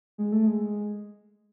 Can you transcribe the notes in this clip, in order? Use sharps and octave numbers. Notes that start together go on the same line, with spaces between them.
G#3
A3
G#3